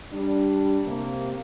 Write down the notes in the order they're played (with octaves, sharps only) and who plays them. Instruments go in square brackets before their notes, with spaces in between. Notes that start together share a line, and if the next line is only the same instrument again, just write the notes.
[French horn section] G3 D4
C3 A#3